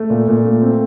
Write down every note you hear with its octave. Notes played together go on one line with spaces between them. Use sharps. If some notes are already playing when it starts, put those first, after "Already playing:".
Already playing: A3
A#2
A#2
A3
C4